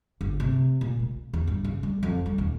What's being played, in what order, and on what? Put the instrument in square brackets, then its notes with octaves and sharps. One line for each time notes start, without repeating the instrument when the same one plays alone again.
[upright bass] G1
C3
A#2
G#3
E2
G2
C#3
G3
F2
G3
D#1